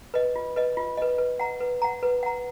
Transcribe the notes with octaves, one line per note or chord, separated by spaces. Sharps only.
B4 D#5
F4
B4 D#5
F4
B4 D#5
B4
F#5 A#5
B4
F#5 A#5
B4
F#5 A#5